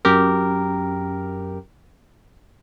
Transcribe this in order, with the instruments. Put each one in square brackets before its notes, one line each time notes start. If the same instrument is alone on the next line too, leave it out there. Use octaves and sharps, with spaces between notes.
[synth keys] F#2 G4 A#4